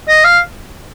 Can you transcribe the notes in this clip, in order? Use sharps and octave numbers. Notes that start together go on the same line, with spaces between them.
D#5
F5